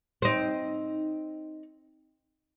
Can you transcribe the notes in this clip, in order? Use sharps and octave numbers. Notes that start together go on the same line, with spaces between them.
C4 D#4